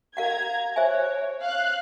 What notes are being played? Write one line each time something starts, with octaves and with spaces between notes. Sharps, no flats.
A#4 F5 F#5 A#5 G#6
C5 C#5 E5 G#5
F5 F#6